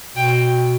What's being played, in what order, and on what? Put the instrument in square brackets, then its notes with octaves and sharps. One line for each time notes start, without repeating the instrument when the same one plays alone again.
[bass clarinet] B2 [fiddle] G5